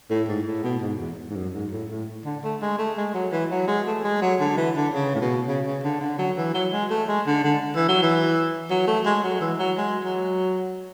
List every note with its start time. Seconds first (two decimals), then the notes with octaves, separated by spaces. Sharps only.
0.10 A2
0.28 G#2
0.46 A2
0.64 B2
0.81 G#2
0.99 E2
1.29 G#2
1.36 F#2
1.54 G#2
1.71 A2
1.90 A2
2.25 D3
2.44 A3
2.62 G#3
2.78 A3
2.97 G#3
3.14 F#3
3.32 E3
3.51 F#3
3.68 G#3
3.87 A3
4.04 G#3
4.22 F#3
4.40 D3
4.57 E3
4.76 D3
4.94 C#3
5.15 A2
5.21 B2
5.47 C#3
5.66 C#3
5.83 D3
6.01 D3
6.18 F#3
6.37 E3
6.54 F#3
6.72 G#3
6.90 A3
7.08 G#3
7.27 D3
7.44 D3
7.75 E3
7.88 F#3
8.02 E3
8.70 F#3
8.87 A3
9.06 G#3
9.23 F#3
9.40 E3
9.59 F#3
9.77 G#3
10.04 F#3